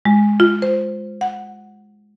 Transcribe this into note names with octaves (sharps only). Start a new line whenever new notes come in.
G#3
F4
C5
F#5